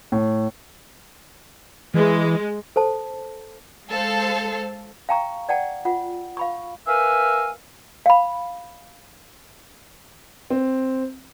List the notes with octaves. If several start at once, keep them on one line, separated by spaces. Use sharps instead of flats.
A2
E3 G#3
A4 C5 A5
G#3 A4 C5 F5
F5 G5 A5 A#5 C#6
D5 F#5 G5 A5
F4 F#5
F5 B5 C#6
A#4 B4 E5 F5 G#5
F5 B5
C4